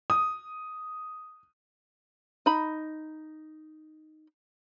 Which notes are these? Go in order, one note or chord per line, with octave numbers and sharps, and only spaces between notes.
D#6
D#4 B5